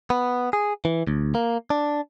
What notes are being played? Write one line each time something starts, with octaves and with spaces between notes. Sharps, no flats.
B3
G#4
E3
D2
A#3
D4